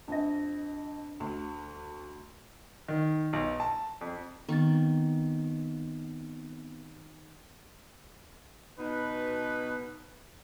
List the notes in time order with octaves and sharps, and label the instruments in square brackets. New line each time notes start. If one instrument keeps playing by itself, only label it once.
[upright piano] F2 D#5 [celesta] D4 A#6
[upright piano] D2
[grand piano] D#3
B1
A5
F2
[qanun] D#3 [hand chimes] B3 C4 A6
[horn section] B2 D#4 B4